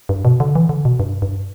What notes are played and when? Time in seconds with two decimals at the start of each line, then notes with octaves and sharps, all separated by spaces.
0.09 G2
0.25 B2
0.40 D3
0.55 E3
0.69 D3
0.85 B2
1.00 G2
1.22 G2